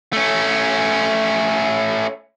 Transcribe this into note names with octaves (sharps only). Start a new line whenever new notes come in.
A3 C#4